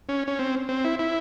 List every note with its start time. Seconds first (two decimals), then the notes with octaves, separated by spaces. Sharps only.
0.09 C#4
0.27 C#4
0.39 C4
0.69 C4
0.84 E4
0.99 E4